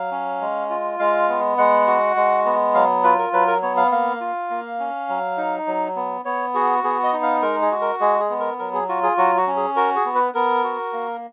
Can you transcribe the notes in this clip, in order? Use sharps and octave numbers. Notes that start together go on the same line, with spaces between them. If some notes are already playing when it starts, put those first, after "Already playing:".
Already playing: F#3 F5
C#4
G#3
F4
G#3 F5
B3
G#3 F#5
F#4
G#3
B3
F#3 F5
F4 B4
A#4
F#3 B4
A#4
B3 C#5
F5
A#3 F5
F4
A#3
C#4
F#3
D#4
F#3
B3
B3 C#5
F#4 G#4
B3 G#4
D#5
D#4
F5
G#3 A#4
G#4
F#4
A#4
G#3 G#4
G#4
B3
A#4
F#3 A#4
G#4
F4 F#4
G#4
F#3 F#4
F#4
C#4
G#4
F#4 A#4
G#4
B3
B4
B3 A#4
F#4
A#3